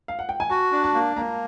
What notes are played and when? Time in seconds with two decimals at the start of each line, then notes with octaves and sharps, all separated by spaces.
0.08 F5
0.19 F#5
0.29 G5
0.40 G#5
0.50 F#4 A5
0.72 D4
0.83 A5
0.94 A#3
1.16 A#3 A#5